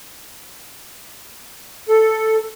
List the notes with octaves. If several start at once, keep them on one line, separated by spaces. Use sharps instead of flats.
A4